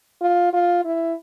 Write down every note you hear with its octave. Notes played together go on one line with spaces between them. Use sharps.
F4
F4
E4